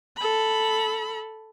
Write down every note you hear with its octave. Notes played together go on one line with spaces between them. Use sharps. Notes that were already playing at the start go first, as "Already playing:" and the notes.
A4 B5